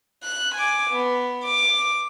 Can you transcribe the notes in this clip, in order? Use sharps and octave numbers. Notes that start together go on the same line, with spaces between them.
F#6
G#5 D6
B3
D6